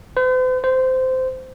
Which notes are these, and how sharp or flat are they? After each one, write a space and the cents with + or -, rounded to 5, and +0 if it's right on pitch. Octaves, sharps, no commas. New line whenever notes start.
C5 -45
C5 -15